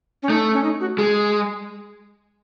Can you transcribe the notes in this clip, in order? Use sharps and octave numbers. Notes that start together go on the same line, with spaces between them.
C#4
A3 D#4
C#4
D#4
F#4
G#3 G#4